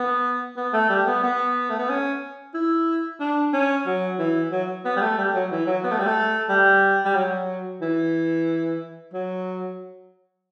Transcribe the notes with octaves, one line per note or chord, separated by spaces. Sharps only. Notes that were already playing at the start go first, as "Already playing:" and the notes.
Already playing: B3
B3
A3
G3
B3
B3
A3
B3
C#4
E4
D4
C#4
F#3
E3
F#3
B3
G3
A3
G3
F#3
E3
F#3
B3
A3
G3
A3
G3
G3
F#3
E3
F#3